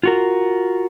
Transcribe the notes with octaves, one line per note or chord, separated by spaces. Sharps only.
F4 F#4 A#4